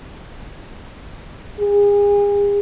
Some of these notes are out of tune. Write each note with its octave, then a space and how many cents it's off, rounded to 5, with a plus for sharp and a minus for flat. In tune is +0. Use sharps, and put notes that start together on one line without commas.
G#4 -35